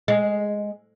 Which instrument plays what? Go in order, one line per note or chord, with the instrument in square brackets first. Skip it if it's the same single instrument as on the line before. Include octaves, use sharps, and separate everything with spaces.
[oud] G#3